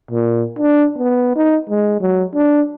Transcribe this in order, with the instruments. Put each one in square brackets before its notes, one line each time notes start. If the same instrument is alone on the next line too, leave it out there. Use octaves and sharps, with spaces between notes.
[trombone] A#2
D4
B3
D#4
G#3
F#3
D4